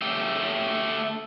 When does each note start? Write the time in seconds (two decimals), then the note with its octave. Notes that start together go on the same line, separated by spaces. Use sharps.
0.01 A3 G4